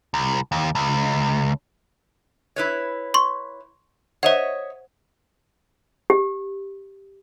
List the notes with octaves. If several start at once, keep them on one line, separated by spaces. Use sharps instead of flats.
C2
D#2
C#2
E4 B4 C#5
C6 C#6
C5 C#5 D#5 E5 F#5
G4